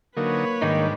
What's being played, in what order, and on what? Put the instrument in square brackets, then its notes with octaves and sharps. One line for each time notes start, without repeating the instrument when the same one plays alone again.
[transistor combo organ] D3 F#3 D#4 [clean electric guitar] A#3 [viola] B4 C#5
[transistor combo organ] G#2 G3 D4 [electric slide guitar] D#3 D#4